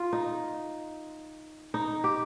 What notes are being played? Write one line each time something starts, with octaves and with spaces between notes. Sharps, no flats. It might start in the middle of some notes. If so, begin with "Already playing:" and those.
Already playing: F4
D#4
D#4
G4